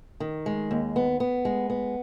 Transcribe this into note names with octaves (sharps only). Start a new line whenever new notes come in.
D#3
G#3
D#2
B3
B3
G#3
B3